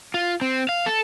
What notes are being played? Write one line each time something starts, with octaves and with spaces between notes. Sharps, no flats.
F4
C4
F5
A4